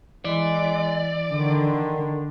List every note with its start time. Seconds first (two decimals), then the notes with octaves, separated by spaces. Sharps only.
0.25 E3 G#3 D5
1.31 D3 D#3